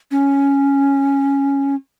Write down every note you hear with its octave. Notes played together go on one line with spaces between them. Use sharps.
C#4